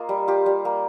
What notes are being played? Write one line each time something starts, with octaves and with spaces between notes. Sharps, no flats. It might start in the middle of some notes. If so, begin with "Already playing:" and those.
Already playing: A#3 F4 D#5
G3
F4 G4
G3
A#3